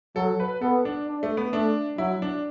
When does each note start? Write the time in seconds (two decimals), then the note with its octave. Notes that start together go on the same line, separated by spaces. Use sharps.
0.16 F#3 A4
0.40 B4
0.62 B3 A4
0.85 D4
1.07 D4
1.23 A3
1.37 B3
1.53 A3 D4
1.98 F#3 E4
2.22 D4